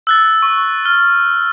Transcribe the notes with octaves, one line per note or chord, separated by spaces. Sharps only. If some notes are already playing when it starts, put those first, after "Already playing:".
E6 F#6 A6
C#6
F6